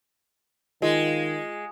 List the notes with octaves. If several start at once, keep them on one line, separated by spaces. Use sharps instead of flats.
D#3 G#3 F4 C#7